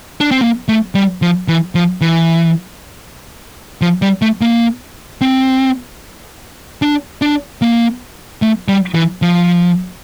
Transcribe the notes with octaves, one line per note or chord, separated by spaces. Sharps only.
D4
C4
A#3
A3
G3
F3
E3
F3
E3
F3
G3
A3
A#3
C4
D4
D4
A#3
A3
G3
E3
F3